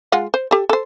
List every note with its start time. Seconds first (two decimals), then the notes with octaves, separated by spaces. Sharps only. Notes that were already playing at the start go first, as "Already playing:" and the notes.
0.12 G#3 F4 F#5
0.34 C5
0.51 G4 A4
0.69 A4 C5